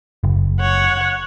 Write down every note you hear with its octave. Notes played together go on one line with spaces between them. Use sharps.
F#1
C#5 F#5